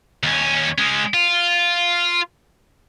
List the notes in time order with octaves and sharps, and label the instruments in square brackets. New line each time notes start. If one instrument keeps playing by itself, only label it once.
[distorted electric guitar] D#2 C#4
G#3 C#4
F4